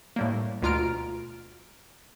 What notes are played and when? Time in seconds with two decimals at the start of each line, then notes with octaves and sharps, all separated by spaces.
0.16 A2 G3 A#3
0.62 D2 B2 F4 A#5 F6 D7